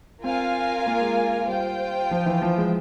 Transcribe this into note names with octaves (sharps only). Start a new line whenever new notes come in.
C4 F4 A#4 F5 G#5
A#3
G#3
G3 F4 C5 G5
F3
E3
F3
G#3